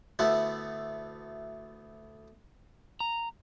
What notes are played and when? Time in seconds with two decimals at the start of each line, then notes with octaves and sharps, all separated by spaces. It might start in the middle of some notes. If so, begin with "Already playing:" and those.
0.19 D2 A3 B3 E4 F#5
3.00 A#5